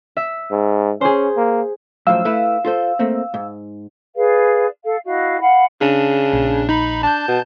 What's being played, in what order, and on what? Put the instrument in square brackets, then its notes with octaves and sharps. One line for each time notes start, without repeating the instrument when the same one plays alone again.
[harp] E5
[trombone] G#2
[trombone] C#4 [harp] G#4 C5
[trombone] A#3
[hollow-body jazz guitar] F#2 A2 F3 [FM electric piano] F5 E6
[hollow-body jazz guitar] A3 E4 B4
F4 A4 C5
A3 A#3 C4
G#2
[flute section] G#4 B4 D5 F5
A4 F5
E4 F#4 D#5 F5
F5 F#5 B5
[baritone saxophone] C#3 [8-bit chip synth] D4
[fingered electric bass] A#1
[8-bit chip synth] D#4 B5
[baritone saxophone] D4 [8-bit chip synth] A5 G6
[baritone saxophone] B2